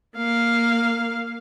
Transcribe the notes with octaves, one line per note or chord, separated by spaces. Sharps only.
A#3 F5